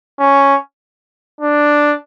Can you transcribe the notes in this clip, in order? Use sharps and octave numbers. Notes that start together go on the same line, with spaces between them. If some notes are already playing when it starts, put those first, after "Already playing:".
C#4
D4